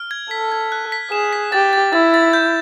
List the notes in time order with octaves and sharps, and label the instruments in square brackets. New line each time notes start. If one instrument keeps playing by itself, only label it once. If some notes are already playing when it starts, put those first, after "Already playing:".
Already playing: [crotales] F6
G#6
[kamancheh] A4 [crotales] B6
[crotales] G#6
F#6
B6
[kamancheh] G#4 [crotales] E7
[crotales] B6
[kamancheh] G4 [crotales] A6
[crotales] A6
[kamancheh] E4 [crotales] A6
[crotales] A6
G6